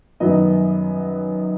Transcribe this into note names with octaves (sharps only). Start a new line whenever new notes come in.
F#2 D#3 F#3 B3 D#5